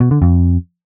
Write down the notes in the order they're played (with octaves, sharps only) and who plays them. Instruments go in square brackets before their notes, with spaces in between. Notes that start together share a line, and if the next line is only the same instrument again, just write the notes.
[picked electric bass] B2
D3
F2